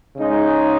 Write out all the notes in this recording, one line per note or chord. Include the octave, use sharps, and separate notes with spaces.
C#3 G#3 D#4